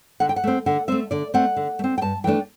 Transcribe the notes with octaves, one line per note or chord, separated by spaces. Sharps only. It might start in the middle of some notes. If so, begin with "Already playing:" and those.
D3 F#5
G5
F#5
A3 C4
D3 F#5
A3 C4 E5
D3 D5
A3 C4 F#5
D3
A3
C4
G5
G2 A5
E3 A3 D4 G5